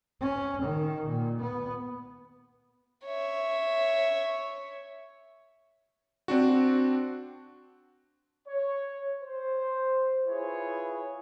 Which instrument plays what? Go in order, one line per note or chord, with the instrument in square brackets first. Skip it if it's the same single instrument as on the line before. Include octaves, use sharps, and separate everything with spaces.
[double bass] C#4
D#3
A#2
B3
[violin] C#5 E5
[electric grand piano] C4 D4 F#4
[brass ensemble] C#5
C5
E4 F4 G#4 B4 C#5